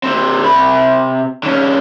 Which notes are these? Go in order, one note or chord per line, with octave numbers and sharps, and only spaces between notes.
D3 C4
C3 B5
D3 C#4